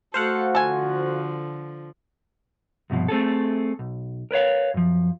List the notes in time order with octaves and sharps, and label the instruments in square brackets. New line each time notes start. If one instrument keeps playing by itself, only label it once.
[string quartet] A3 A4 [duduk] F#4 [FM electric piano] C5 F5 F#5
[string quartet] D3 F3 [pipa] A4 G#5
[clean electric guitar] C2 G2 B2 F3
A3 C4 G#4 A4
B1
A#4 B4 C#5 F5
F#2 F3